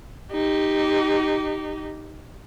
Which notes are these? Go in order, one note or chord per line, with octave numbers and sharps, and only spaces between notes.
D#4 G4